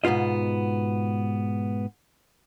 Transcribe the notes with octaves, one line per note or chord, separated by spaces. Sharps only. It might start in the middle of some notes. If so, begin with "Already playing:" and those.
G#2 B2 B3 F4 D#5